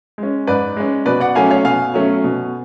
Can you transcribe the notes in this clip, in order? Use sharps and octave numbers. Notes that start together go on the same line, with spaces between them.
G#3
C#4
G#2 B4 D5
G#3 C#4
B2 B4 D5
D5 F#5
F#3 A3 C#4 F5 G#5
C#5 F5
B2 F5 G#5
F#3 A3 C#4
B2